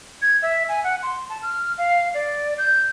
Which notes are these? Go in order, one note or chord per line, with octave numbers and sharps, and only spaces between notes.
G#6
E5
G#5
F#5
C6
A5
F6
F5
D5
G6